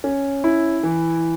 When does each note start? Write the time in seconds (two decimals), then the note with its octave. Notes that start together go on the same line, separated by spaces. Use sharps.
0.04 C#4
0.44 E4
0.83 E3